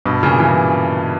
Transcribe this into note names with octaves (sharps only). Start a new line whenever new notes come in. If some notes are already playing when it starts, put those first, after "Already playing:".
G2 B2
A#2 C#3
C#3 E3